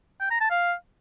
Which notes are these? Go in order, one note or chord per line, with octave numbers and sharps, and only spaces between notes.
G5
A#5
A5
F5